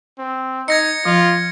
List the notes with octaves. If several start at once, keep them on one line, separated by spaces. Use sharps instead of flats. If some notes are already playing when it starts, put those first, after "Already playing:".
C4
D#4 D#5 G#6 A#6 C#7
F3 F4